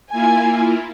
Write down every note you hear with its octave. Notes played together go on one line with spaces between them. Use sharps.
A#3 E4 F4 G#5